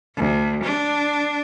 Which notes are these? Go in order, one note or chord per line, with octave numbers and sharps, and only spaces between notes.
D2
D4